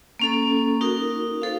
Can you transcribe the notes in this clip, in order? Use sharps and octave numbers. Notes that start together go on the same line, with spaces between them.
A#3 C#4 A4
D#4 F#4 A#4
A4 C5 F5